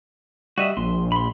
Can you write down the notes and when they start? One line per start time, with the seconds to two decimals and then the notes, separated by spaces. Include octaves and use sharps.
0.58 G3 F#4 D#5 E5
0.77 A#1 C6
1.12 B5 C6